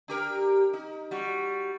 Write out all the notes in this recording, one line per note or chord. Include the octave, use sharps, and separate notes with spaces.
D4 G4 A#4
D#4
G3 F#4